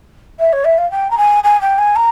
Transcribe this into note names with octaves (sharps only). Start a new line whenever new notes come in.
E5
C#5
E5
F5
G5
A#5
G#5
G#5
G5
G#5
A#5